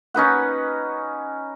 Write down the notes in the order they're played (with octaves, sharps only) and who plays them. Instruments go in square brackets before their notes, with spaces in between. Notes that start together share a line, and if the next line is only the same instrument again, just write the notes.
[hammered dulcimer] C#4 D#4 B4 F#5